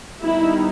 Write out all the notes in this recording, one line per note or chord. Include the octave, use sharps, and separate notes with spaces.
D#3 G3 B3 D#4 E4